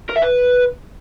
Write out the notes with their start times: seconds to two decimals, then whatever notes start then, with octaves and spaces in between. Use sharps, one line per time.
0.10 A#4
0.16 E5
0.22 B4